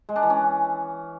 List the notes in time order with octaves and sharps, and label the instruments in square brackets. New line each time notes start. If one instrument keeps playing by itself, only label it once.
[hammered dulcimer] G#3
D4
E3
C#4